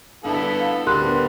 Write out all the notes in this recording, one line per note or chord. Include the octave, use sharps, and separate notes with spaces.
G2 D3 B3 E4 A4
F5
D2 G3 C4 A#4 C6 F#6
D3 B3